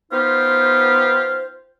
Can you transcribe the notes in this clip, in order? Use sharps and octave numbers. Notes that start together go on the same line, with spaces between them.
B3 D#4 F4 G4 C5